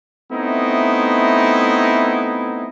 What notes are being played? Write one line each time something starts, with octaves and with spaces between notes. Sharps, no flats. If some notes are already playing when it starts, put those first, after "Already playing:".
A3 B3 C4 D#4 E4